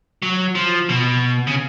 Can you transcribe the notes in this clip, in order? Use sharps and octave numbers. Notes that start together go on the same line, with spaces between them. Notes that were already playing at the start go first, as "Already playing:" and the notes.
F#3
F3
B2
C#3